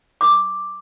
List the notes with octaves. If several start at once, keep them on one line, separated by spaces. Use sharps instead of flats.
D6